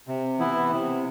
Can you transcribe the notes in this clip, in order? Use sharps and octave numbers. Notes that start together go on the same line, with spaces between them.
C3
E3 B3 E4
C3